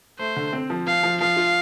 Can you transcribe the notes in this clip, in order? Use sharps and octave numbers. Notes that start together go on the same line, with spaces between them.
A3 C5
D3
C4
F3
F3 F5
F3
F3 F5
F4